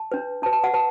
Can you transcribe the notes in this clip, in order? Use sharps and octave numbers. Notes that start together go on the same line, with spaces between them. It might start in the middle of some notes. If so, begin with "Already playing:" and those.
Already playing: A5
D4 B4
D4 B4 A5
A5
F#5
B4 A5